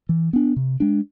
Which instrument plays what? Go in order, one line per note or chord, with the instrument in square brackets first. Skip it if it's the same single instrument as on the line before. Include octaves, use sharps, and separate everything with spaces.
[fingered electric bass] E3
B3 D4
C3
G#3 D4